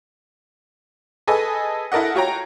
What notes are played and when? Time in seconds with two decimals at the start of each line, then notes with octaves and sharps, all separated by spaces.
1.27 G#4 A4 B4 D#5 G#5
1.92 E4 A4 A#4 D#5 F#5
2.15 F4 F#4 C#5 G5 A#5